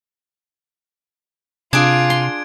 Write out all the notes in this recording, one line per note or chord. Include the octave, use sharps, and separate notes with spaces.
C3 D4 F4 G#4 G#6 D7
C6